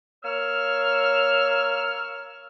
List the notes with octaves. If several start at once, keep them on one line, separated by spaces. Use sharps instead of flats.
A#3 C#5 E6 F6